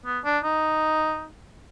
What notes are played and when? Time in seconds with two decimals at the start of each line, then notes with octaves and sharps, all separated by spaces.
0.06 B3
0.25 D4
0.44 D#4